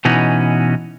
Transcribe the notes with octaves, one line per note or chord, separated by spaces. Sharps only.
B2 E3 C#4 D#4 F#4